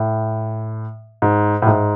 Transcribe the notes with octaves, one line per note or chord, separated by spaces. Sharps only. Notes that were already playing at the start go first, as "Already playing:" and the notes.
Already playing: A2
G#2
A2
G#2